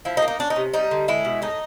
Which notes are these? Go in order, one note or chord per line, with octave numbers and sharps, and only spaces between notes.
F3 E4
D#4
A#3
D#4
C#4 D4
D#4
C3
G3 D#4
D3
G#3 E4
B2
A2 D#4